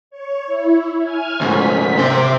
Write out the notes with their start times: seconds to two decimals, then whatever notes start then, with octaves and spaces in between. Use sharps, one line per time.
0.11 C#5
0.46 E4
1.02 G#5 F6 G#6
1.41 D2 G#2 B6
1.99 C3 C5 E5 D6